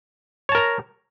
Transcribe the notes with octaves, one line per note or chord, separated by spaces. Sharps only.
A#4 C#5 A5 A#5